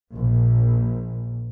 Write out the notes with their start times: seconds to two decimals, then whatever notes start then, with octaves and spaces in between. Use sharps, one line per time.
0.14 A#1